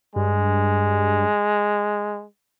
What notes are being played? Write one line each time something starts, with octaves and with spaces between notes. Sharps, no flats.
G2 G#3